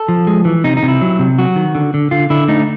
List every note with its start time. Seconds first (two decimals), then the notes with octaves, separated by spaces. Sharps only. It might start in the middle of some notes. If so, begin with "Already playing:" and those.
Already playing: A4
0.08 F3
0.27 G#3
0.45 E3
0.64 C3 D#4
0.77 D#4
0.83 C3
0.88 E4
1.01 F#3
1.19 C3
1.38 F#3 F#4
1.56 D#3
1.75 D3
1.94 D3
2.11 D3 F4
2.30 D3 E4
2.48 A3 D#4